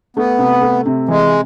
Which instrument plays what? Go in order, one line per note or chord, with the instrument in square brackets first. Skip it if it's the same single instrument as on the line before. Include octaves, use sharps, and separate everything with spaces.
[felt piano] A3 [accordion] B3
[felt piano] C3
A3
C3
[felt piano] E3 [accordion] G#3